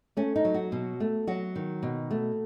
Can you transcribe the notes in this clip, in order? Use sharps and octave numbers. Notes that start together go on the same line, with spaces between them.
A3 C#4
D#4
F#3
F#4
B2
A3
F#3 F#4
D#3
B2
A3